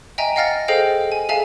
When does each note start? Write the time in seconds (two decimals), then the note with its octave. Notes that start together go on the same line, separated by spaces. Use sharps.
0.18 D#5 E5 G5 G#5 A#5
0.36 D#5 F5 F#5 F6 A6 A#6
0.68 G#4 A4 C5 D#5 F5 G5
1.12 G#5
1.29 G#4 A4 E5 F5 G#5 A5